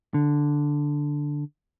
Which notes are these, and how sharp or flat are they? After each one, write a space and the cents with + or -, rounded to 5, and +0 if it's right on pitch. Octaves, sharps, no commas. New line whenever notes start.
D3 +0